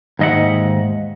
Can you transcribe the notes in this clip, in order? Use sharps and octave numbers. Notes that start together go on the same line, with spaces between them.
D#2 G#2 D#5 E5 F#5